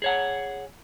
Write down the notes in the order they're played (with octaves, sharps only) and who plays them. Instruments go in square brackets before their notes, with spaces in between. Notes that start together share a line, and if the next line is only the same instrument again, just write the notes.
[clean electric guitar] G#4 C#5 F#5